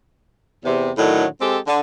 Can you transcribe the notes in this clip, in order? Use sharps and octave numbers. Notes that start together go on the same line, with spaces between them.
E2 C3
A2 D3 D#3 F#3
G#3 C4 G4 A4
D3